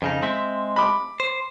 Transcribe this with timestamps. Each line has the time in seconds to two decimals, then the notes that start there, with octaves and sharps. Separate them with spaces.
0.02 F2 C#3 D#4
0.22 G#3 C4 E5
0.76 B5 D6
1.20 C5